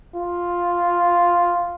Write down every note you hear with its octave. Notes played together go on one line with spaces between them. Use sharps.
F4